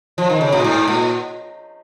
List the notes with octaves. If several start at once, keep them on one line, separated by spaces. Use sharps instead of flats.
F3
D#3
C#3
A#2
G#2
A#2